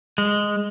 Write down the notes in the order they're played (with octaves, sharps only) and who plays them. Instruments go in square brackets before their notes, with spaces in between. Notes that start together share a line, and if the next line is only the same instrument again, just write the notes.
[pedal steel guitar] G#3